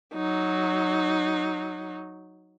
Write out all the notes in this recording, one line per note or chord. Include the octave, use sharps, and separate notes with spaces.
F#3 D#4